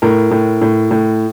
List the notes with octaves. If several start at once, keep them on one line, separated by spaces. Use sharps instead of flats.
A2 A#4
A2
A2
A2